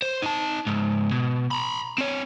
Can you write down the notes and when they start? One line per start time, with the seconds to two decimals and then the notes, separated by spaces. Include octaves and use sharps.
0.02 C5
0.22 D#4 A5
0.67 C#2 G#2
1.11 B2
1.51 A#5 B5
1.98 C4 C#5